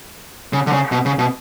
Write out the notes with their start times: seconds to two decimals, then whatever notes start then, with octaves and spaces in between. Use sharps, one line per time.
0.53 C#3
0.67 D3
0.72 C#3
0.92 B2
1.05 C#3
1.19 B2